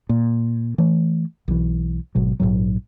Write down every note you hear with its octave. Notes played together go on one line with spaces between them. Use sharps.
A#2
E3 A3
B1 E3
G#1 B2 F#3
A#1 E2 G#2 F#3